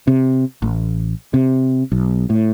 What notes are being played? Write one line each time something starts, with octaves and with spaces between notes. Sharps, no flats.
C3
A1
C3
B1
A2